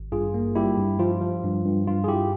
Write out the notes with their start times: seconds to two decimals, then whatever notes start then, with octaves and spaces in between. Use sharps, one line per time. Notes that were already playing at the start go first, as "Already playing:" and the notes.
Already playing: G#1
0.12 G2 F4 G#4
0.34 A#3
0.55 G3 E4 G4
0.77 G2
0.99 F3 F4
1.21 F3
1.43 G2
1.65 G2
1.87 G2 F4
2.04 G#4
2.08 G2 E4 G4